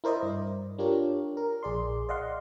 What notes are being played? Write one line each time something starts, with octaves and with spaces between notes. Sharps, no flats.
E4 A#4 C5 D5 D#5
G2
D4 F4 G4 A#4 C#5
A#4
A#1 G#4 D5 C6
D5 D#5 F5 F#5 C6